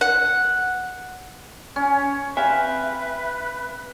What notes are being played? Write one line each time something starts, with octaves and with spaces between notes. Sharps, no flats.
F#5
C#4
C4 G4 B4 E5 F5 G#5